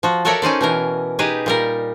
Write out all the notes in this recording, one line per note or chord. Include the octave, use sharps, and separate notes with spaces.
F3 F#4
F#4 A4 A#4 C#5 D5 E5
C#4 D#4 C5 D5
B2 E3 A#4
D#4 G4 G#4 B4
A#2 G3 A#4